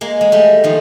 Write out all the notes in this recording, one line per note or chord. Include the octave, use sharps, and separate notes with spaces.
G#3 A#3
G#3
G3 A3
D#3 F3